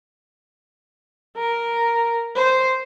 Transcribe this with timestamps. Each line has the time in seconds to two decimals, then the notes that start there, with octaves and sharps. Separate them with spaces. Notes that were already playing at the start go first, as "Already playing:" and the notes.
1.37 A#4
2.35 C5